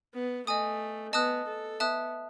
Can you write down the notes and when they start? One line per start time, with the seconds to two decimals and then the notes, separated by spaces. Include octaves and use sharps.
0.14 B3
0.47 A3 D#5 G#5 D#6
1.13 B3 D#5 A5 D#6 F#6
1.47 A4
1.80 B3 E5 A5 D#6 F#6